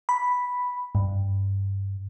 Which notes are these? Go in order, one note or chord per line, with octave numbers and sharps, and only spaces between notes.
B5
G2